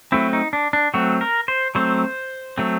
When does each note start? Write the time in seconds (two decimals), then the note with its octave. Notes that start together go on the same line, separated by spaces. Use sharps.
0.12 F#3 A3 C4 E4
0.33 D#4
0.53 D4
0.73 D4
0.94 F#3 A3 C4 F#4
1.21 A#4
1.48 C5
1.75 F#3 A3 C4 C5
2.58 F#3 A3 C4